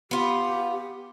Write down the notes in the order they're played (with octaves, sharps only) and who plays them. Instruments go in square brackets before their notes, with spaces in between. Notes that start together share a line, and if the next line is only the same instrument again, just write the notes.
[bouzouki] B3 F4 [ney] G4